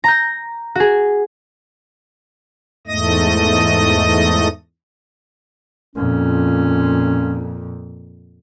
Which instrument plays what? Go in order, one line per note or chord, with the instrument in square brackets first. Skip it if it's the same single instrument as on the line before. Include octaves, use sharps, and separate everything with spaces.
[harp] A#5 G6
F#4 G#4
[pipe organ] E2 G#2 A3 D#5 D#6 A#6
[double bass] F2 A#2 [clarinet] C#4